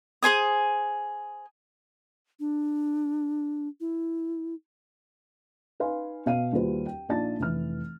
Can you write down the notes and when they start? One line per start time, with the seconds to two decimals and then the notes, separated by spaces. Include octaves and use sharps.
0.23 G#4 C5 G#5 D#6
2.40 D4
3.80 E4
5.80 D#4 B4 F5 G#5 C6
6.26 B2 F5 D#7
6.52 D#2 G3 F4 F#4 B4 C5
6.86 G5
7.09 A#1 D#4 F4 D5 A5 A6
7.39 F1 E3 F6